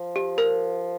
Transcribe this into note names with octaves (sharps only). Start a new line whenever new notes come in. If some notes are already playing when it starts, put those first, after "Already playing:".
Already playing: F3
G4
A#4